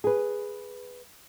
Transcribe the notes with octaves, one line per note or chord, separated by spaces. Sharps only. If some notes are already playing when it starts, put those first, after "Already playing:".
G#4 B4